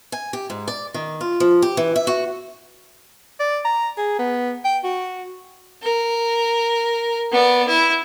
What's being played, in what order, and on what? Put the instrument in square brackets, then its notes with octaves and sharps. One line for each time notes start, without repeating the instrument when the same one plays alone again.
[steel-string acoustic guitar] G#5
G4
G#2
D5
D#3
F4
F3
G4
E3
E5
F#4
[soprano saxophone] D5
A#5
G#4
B3
G5
F#4
[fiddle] A#4
B3 D5
E4